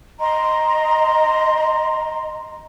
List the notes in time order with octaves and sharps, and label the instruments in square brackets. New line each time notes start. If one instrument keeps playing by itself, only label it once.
[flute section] D#5 A#5 C6